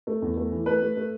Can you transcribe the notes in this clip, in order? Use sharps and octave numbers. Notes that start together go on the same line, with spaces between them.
A3
E2
A3
E3
A3 B4
A3
A3